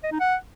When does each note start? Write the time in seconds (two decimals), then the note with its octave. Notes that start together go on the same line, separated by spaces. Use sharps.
0.03 D#5
0.12 D#4
0.20 F#5